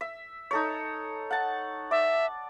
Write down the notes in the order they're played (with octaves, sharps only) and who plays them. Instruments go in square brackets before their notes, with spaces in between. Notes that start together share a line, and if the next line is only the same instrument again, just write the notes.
[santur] E5
D#4 A4 C#5
F#5 A5
[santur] D5 [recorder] E5